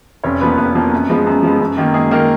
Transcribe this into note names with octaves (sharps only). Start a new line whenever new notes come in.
F1 C#4 C#5
F2 F3 A#3 B3 B4
F1 B3 B4
F2 F3 A#3
F#2
F3 G#3 B3
F#2
F3 G#3 B3
F#2
D#3 A#3
F#2 G#3 G#4
D#3 A#3 A#4